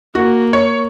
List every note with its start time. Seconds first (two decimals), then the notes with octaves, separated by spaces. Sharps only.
0.15 A#3 F#4
0.53 C#5